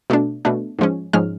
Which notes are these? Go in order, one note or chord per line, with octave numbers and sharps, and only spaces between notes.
B2 A3 D4
B2 A3 D4
G#2 F3 G#3 C#4
G#2 F3 G#3 C#4 F6